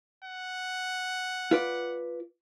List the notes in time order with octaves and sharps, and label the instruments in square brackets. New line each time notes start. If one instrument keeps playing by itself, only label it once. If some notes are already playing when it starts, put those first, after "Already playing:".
[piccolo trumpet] F#5
[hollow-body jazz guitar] F4 B4 D5